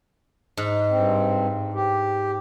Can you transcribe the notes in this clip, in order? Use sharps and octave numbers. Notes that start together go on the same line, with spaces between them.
G#2
G2 C4
G4